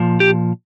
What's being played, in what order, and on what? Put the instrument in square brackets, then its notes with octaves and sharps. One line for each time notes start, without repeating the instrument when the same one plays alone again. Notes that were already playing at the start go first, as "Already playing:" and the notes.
Already playing: [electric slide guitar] A#2 F3
G4